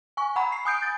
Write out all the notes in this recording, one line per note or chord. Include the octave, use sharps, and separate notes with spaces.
G#5 C#6
F#5 A#5 B5
C7
G#5 D#6 G6 D7
A6